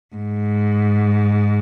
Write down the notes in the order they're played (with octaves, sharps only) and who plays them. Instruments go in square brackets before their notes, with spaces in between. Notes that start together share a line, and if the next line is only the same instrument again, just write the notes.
[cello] G#2